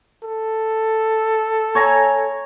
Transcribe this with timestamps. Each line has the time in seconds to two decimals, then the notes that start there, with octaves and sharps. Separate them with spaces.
0.24 A4
1.75 C#5 G#5 A#5